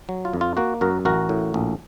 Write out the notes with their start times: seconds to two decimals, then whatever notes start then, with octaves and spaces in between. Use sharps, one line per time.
0.09 F#3
0.25 F4
0.33 F2
0.41 F4
0.57 A#3 F#4
0.81 F#2 F#4 A#4
1.05 A1 F#4 A#4
1.29 A2
1.54 A#1